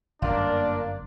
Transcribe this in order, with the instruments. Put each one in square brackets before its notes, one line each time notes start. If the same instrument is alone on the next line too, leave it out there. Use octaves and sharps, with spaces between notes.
[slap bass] G1 F#2 [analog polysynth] A#3 A#4 D5 [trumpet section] D4 [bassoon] F4